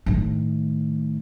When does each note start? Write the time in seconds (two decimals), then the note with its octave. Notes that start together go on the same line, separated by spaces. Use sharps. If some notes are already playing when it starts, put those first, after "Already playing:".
0.06 A2 D#3